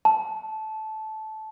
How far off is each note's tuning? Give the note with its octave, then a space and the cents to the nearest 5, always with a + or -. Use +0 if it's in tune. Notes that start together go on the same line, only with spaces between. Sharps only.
A5 -15